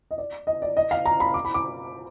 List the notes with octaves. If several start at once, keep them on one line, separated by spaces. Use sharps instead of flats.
D#5
D5
D#5
D5
D#5
F5
A#5
B5
D6
B5
D6